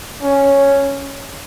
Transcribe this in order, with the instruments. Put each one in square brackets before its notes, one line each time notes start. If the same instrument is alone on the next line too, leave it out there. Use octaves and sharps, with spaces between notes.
[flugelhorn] C#4